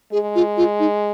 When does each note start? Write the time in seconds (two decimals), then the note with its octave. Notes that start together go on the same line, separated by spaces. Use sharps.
0.12 G#3 G#4
0.35 F4
0.57 F4
0.79 D#4